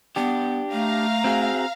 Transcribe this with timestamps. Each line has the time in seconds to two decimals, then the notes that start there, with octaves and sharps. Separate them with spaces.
0.16 B3 D4 G4
0.72 A3 F5 A#5
1.24 C4 F#4 G#4